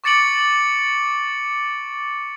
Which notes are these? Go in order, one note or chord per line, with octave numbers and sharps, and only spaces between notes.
C#6 D6 A6 C#7 D7 F#7